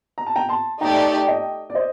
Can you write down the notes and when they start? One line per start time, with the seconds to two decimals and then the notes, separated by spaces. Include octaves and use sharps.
0.18 A#5
0.27 A5
0.36 G5 A#5
0.49 A5 C6
0.80 A3 D#4 G4 D5 G5 A#5
1.27 D#5 G5
1.70 D5
1.75 C5 D#5